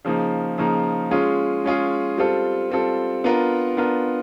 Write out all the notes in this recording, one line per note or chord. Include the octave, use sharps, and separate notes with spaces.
C#3 F3 A#3 D#4
C#3 F3 A#3 D#4
G#3 C#4 F4 G#4
G#3 C#4 F4 G#4
G3 C4 F4 A4
G3 C4 F4 A4
B3 D4 F4 A#4
B3 D4 F4 A#4